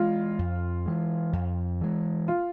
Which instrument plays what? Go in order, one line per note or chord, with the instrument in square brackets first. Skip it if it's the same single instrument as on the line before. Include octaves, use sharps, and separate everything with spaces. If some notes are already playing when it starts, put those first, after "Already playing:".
Already playing: [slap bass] E3 G#3 [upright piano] F4
[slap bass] F2
E3 G#3
F2
E3 G#3
[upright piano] F4